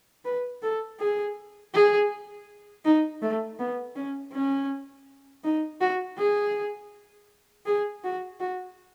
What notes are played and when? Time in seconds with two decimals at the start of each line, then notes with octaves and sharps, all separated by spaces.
0.25 B4
0.62 A4
0.99 G#4
1.74 G#4
2.85 D#4
3.22 A3
3.59 B3
3.96 C#4
4.33 C#4
5.44 D#4
5.81 F#4
6.18 G#4
7.66 G#4
8.04 F#4
8.40 F#4